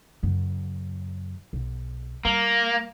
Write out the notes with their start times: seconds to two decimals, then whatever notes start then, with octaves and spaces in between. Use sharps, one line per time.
0.23 F#2 C#3
1.53 B1
2.25 G3 A#3